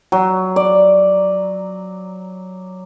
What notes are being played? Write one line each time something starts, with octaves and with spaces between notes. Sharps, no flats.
F#3
D5